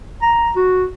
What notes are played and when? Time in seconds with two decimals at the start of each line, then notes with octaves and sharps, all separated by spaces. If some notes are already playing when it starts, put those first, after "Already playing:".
0.22 A#5
0.56 F#4